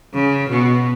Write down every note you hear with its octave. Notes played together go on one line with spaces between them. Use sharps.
C#3
B2